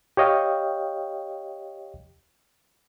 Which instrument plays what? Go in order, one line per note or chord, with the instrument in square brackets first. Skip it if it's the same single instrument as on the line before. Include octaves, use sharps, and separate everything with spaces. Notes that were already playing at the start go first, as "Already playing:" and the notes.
[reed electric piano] G4 C#5 D#5 F5 G5